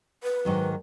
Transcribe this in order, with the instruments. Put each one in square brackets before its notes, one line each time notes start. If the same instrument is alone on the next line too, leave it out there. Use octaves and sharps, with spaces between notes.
[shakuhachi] B4
[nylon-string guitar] G#2 D#3 F#3